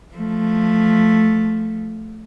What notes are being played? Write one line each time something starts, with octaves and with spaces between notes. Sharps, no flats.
F3 A3